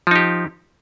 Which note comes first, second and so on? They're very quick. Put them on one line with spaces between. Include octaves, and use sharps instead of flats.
F3 D#4 G4